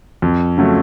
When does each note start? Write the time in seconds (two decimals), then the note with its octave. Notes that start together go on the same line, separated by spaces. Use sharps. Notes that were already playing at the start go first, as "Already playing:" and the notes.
0.22 F2
0.58 C#3 F#3 A3